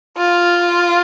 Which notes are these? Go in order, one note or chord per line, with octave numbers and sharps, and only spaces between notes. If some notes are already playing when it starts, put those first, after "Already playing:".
F4